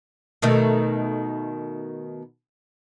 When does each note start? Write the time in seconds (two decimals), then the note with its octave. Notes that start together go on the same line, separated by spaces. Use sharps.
0.42 B2 D#3 A3